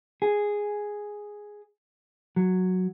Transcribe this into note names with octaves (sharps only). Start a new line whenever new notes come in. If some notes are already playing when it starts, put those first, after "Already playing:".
G#4
F#3